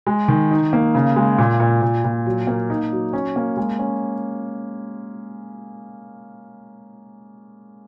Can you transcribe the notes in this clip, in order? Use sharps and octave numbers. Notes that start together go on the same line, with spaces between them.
G#3
D#3
D#4
A#3
C#3
G#3
A#2
A#2
A#2
A#2
F#3
A#3
D#4
F#3
C#4
A#3
G#3
C#4